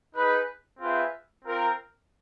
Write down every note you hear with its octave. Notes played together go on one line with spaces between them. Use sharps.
D#4 G#4 B4
C4 F4 G#4 B4 E5
C4 F4 A#4